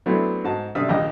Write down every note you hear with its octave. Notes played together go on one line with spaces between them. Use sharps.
F#3 A3 B3 C4 D4 E4
G#2 F#4 A5
C3 D4 D5 E5 D#6 F6
A#1 D#2 G4 D#5 D6